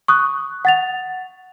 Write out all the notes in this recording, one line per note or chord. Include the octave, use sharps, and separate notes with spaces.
C#6 D#6 F#6
F#5 A6 F7